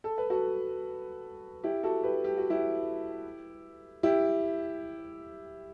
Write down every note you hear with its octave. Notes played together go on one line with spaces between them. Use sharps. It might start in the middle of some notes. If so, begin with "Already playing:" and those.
A4
B4
F#4 A4
E4 G4
F#4 A4
G4 B4
G4
F#4
E4 G4
E4 G4